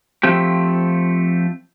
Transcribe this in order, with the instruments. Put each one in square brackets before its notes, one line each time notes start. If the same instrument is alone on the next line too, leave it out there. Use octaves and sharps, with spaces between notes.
[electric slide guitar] F3 A3 C4 G4